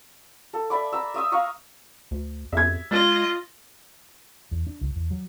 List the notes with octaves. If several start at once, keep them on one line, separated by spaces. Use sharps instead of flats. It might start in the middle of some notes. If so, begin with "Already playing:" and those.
A4
D5 E5 B5 D6
A#5 E6
E5 D#6 E6
F5 A#5 C#6
D2
F2 E5 G#6
G#3 F4 D#5 A6
E2
D4
C#2
E2
F#3